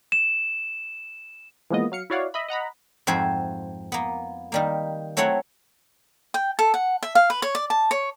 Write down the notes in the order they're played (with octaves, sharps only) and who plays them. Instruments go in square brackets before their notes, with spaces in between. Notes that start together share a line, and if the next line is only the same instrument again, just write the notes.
[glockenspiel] E7
[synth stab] E3 F3 G#3 A#3 B3 D#5
F#3 F5 C#7
E4 F#4 C#5 D5 F5 F#5
D#5 E5 B5
D#5 F#5 A#5 B5
[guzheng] F2 G#2 C4 F#4 C5 G#5
A#3 B3
D#3 G3 A#3
F#3 A3 C4 E4 C#5 F#5
[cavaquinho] G5
A4
F#5
E5
F5
B4
C#5
D5
A5
C#5